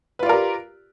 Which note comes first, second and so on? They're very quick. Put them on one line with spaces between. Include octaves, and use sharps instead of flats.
B4 F4 D5 A#4 G4